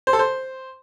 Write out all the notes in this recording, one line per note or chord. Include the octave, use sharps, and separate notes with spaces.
C5
A4
C5